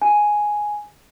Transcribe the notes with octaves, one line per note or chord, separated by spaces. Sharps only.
G#5